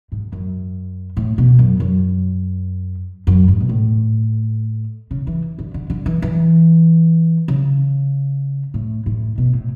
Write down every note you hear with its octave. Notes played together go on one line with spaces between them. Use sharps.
G#2
F#2
A2
B2
F#2
F#2
F#2
G#2
B2
A2
C#3
E3
D3
D3
D3
E3
E3
C#3
A2
A2
B2
A2